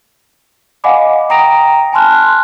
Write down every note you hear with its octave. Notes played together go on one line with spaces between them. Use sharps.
D#5 F5 F#5 G#5 B5 D6
G5 A#5 D#6 A#6 D7 F7
G#5 A5 B5 C6 F6 F#6